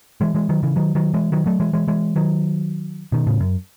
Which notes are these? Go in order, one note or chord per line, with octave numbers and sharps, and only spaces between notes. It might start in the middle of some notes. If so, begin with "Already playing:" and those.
E3 G#3
E3 G#3
D#3 F#3
C#3 E3
D#3 F#3
D#3 F#3
E3 G#3
D#3 F#3
F#3 A3
E3 G#3
E3 G#3
E3 G#3
D#3 F#3
B2 D#3
A2 C#3
F#2